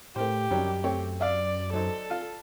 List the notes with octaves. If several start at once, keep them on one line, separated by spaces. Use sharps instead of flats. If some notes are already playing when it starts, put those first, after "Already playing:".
A2 A3 G4 A#4 C5
F#2 D#3 F#3 G3
A3 C4 C#5
D5 E5 F5
F#3 D#4 A4 C5
F4 F5